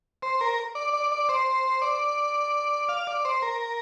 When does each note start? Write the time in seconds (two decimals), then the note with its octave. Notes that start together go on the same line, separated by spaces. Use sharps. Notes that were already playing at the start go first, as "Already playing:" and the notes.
0.22 C5
0.41 A#4
0.75 D5
0.93 D5
1.12 D5
1.29 C5
1.82 D5
2.89 F5
3.07 D5
3.25 C5
3.42 A#4